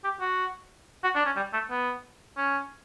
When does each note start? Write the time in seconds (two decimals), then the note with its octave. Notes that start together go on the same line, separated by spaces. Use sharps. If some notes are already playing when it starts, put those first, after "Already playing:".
0.04 G4
0.20 F#4
1.04 F#4
1.15 D4
1.25 C#4
1.36 G3
1.53 A3
1.70 B3
2.37 C#4